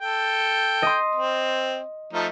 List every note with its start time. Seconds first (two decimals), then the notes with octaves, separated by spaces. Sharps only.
0.01 A4 G5
0.82 D#5 C6
1.15 C4
2.13 F3 A3 D#4